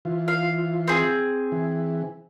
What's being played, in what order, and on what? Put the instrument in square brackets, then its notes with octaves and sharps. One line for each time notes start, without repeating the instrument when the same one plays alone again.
[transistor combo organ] E3 F4
[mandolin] F5
C4 G#4
[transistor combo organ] E3